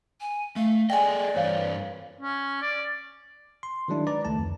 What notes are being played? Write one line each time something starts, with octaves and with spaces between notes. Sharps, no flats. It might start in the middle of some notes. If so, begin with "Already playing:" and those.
G#5
A3 F5
G#4 A4 D5 D#5 G5 G#5
G2 E3 C5 C#5 F5
C#4
D5
C6
D#3 F#3 G#3 D4 E4
B4 D5 A#5
C#2 D#3 A3 A5
F2